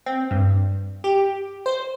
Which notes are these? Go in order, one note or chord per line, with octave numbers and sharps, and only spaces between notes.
C4
G2
G4
C5